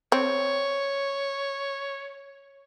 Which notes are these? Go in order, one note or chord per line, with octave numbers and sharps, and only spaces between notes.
C4 C#5